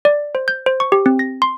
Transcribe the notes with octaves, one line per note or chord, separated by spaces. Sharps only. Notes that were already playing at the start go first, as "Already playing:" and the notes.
D5
C5
G6
C5
C#6
G4
C4
A#6
C6